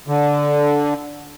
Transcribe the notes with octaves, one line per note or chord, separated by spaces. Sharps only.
D3